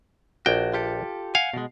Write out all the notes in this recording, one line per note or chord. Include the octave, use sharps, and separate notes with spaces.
A#1 F#4 G5
F4 G4 A4
F5 F#5 G#5
B2 G#3